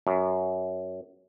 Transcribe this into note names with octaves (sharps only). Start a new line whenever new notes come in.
F#2